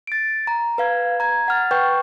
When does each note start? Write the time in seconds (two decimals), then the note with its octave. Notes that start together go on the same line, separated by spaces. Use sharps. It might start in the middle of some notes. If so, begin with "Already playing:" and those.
0.07 A6 D7
0.47 A#5
0.78 B4 F5 G#6
1.20 A#5 G#6
1.48 F#5 F6 A6
1.71 B4 G5 C#6 F#6 G6